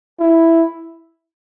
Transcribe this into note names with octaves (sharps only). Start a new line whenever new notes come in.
E4